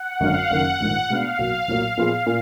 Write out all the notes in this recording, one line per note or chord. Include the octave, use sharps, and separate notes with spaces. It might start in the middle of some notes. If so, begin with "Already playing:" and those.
Already playing: F#5
G#1 F#2 D3 F5
F#1 F#2 D#3 F#5
A#1 G#2 D#3 F#5
B2 G#3 B3 D4 F5
B1 B2 F#3 A#3
B1 A#2 F#3 A#3
A#2 F3 B3 F4 G#4
A#2